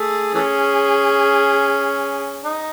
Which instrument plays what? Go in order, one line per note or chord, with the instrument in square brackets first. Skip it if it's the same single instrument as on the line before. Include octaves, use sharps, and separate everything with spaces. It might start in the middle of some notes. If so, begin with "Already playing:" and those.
Already playing: [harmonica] A3 [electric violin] G#4
[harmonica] E3 A3 C#4
D#4